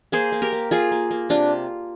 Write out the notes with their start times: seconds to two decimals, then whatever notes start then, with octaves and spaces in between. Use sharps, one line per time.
0.12 A#3 G#4 C5
0.32 A#3
0.42 G4 A#4
0.52 A#3
0.71 A#3 F4 G#4
0.92 A#3
1.11 A#3
1.29 C3 D4 F4